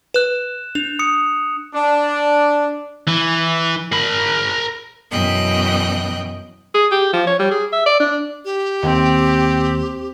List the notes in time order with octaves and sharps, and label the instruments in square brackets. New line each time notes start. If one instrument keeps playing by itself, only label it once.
[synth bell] B4 [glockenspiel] F#6 E7
[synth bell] D4 [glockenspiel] F7
[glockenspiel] D#6 C#7
[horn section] D4
[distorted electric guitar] E3
A#4 B5
[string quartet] F#2 B2 E3 D#5 G5 F#6
[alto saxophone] G#4
G4
F3
C#5
G3
G#4
E5
D5
D4
[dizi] G4
[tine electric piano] D#2 [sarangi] C4